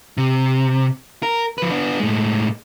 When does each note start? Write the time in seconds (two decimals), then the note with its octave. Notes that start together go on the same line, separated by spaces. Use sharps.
0.17 C3
1.23 A#4
1.58 F3 B4
1.71 B3 D4
2.00 A2 G#3